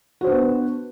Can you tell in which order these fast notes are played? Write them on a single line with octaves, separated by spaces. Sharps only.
F#4 C5 D4 B3